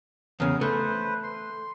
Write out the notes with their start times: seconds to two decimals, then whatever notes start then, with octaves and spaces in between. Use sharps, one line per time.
0.40 E2 C#3 A#4 D#6
0.61 A3 B4 C5
1.23 C6